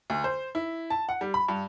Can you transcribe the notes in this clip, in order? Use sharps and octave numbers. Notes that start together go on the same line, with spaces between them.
D2
C5
E4
A5
F#5
G3
B5
G2